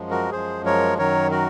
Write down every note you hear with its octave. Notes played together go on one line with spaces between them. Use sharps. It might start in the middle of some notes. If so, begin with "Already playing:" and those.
Already playing: F#2 F3 G#3
F#4 A#4
F#2 F3 G#3 G#4 C5
A#4 C#5
F#2 D#3 F#3 A#4 C#5
F#4 A#4